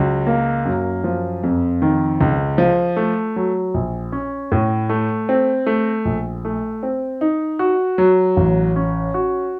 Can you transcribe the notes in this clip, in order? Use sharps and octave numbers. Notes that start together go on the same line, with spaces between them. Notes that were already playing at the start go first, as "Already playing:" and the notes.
Already playing: C#2 F#3
A#3
F#2
F3
F2
D#3
C#2
F3
A3
F#3
A#1
C#4
A2
A3
C4
A3
A#1
A3
C4
D#4
F#4
F#3
A1
C#4
F#4